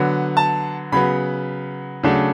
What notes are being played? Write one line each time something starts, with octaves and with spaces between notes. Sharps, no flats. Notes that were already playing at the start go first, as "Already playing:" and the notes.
Already playing: D3 F#3 B3
A5
C#3 F#3 B3 B5
C#3 F#3 A3 D4